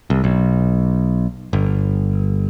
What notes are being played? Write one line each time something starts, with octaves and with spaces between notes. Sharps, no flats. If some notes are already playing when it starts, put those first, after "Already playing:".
C2
B1
G1